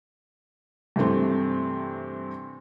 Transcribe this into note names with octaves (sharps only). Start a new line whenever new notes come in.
G2 C3 E3 A3 C4